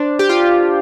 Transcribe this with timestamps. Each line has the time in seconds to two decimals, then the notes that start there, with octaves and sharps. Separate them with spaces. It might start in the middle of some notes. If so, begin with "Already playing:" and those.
Already playing: D4 C5
0.19 G4
0.29 F4